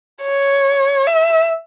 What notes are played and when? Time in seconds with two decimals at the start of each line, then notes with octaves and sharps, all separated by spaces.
0.23 C#5
1.07 E5